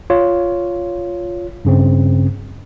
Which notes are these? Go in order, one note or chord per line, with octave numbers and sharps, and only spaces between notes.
F4 C#5
G2 C#3 C4